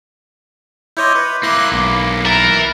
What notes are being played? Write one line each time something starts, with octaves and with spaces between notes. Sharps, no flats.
E4 C#5 D#5 C6 D6 G6
B4
A#3 E4 B4 C6 D6 F#6
B1 D6
E4 A#4 B4 A6